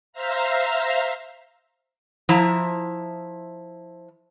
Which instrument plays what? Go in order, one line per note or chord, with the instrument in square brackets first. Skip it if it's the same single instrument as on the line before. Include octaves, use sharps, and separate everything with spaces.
[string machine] C5 E5 F5 A#5
[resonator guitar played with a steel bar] F3 E4 A#5